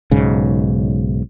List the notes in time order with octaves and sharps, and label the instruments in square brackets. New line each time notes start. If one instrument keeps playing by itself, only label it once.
[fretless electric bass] B1 G#2 C#3